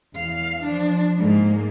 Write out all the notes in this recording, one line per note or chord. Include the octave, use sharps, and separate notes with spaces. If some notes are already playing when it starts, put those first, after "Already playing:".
E2 F5
F3 D4
G#2 A#3